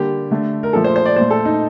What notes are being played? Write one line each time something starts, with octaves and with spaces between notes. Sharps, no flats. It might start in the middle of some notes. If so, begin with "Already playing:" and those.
Already playing: D3 G3 A#3 G4
D3 A3
A#4
A#2 F3 A3 A4
C5
C5
D5
A#2 A3 C5
A4
D#4